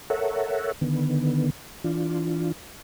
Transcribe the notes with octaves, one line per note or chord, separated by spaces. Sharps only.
A4 A#4 C#5 E5 F#5
D3 D#3 B3
E3 D4 F4